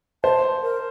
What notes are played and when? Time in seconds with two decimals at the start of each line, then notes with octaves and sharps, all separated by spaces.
0.24 C5 A5
0.63 A#4